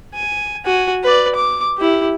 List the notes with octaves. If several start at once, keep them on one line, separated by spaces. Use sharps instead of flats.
G#5
F#4 G#5
B4 D5
D6
E4 G4